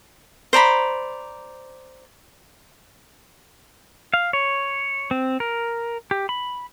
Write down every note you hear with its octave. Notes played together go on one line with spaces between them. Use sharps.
C5 D5 A#5 B5
F5
C#5
C4
A#4
G4
B5